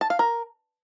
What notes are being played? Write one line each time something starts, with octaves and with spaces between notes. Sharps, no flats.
A5
F5
A#4